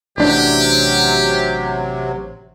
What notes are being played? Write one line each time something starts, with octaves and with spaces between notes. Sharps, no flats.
A1 C3 F#3 D4 G4